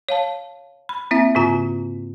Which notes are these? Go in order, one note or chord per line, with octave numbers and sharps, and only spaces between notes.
C#5 F5 A5
B5
A#3 C4 E4 E5
G#2 C#3 F4 A#5